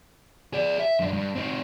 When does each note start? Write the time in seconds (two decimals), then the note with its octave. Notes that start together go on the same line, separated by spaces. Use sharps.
0.53 G#4 D5
0.79 E5
1.00 F#2 D4
1.13 G2
1.35 C4 D#4